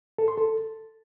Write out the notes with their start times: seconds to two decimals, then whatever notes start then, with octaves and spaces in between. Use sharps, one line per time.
0.18 A4
0.28 C6
0.37 A4